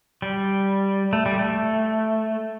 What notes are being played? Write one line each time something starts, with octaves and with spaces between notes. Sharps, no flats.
G3
A3
G3
A3